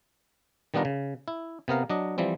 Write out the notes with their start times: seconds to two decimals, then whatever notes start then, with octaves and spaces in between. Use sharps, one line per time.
0.74 D#3 G3 B3 D4 F4 A#5
0.85 C#3
1.28 E4
1.68 C3 B3 A#4 F5
1.90 F#3 D4 D#5
2.18 E3 F3 G3 C4